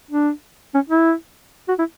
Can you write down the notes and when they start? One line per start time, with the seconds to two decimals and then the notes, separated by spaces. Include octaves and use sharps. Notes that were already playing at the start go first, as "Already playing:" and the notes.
0.11 D4
0.75 C#4
0.90 E4
1.69 F#4
1.79 E4